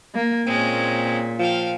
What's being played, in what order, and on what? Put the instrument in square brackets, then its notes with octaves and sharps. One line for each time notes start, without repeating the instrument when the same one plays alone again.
[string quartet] A#3
[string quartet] A#2 [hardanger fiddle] G#3 C#4 [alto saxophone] C4
[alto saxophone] F3 [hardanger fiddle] F5 G5